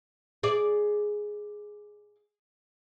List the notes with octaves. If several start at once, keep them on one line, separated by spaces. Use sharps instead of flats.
G#4 D5